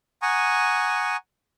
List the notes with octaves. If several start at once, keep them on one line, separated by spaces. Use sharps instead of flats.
F#5 G#5 A#5 C#6 D#6